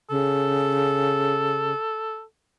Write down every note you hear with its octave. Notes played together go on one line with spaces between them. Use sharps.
C#3 A4